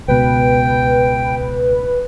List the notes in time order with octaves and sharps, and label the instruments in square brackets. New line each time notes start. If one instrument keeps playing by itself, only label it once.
[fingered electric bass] C#2 B2 [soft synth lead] B4 [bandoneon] G5